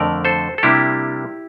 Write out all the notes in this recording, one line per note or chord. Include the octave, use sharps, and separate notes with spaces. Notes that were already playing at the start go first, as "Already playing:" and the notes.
Already playing: F2 D3 A3 A#4 D5
A4 C5
A4
C3 G3 A#3 D4 E4 G4